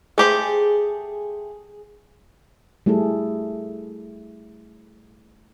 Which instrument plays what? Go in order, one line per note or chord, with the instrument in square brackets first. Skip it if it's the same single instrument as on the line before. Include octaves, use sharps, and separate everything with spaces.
[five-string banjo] A3 G4 C5 [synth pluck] G#4
[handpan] G3 A3 E4 G#4 A4